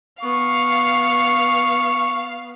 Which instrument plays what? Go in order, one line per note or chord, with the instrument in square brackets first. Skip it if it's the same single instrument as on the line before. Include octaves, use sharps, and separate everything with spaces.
[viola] B3 [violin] F5 [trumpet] C#6